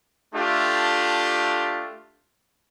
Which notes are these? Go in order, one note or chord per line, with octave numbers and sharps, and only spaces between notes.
A3 D4 F4 G4